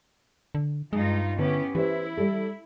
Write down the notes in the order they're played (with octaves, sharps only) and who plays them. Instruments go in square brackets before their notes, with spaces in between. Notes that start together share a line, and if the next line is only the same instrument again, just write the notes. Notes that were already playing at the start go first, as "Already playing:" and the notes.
[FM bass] D3
[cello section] G2 D#4 F4 [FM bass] G#3
[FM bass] D3 [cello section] B3 C#4 G4 [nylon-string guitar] E4 B4
[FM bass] E3 [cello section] E4 [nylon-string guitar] G4 B4 C5
[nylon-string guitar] G3 G4 A4